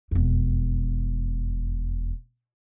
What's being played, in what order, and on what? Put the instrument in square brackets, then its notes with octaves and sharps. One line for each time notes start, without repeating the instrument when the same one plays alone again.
[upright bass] E1 F2